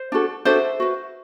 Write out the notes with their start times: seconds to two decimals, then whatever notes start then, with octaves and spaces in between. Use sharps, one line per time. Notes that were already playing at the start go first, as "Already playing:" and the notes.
Already playing: C5
0.12 D4 F#4 A4
0.45 D4 F#4 A4 C5 E5
0.80 F#4 B4